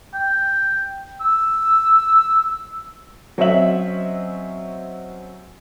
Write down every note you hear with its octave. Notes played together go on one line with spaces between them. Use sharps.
G5
E6
F#3 C4 C#4 D#5 E5 F#7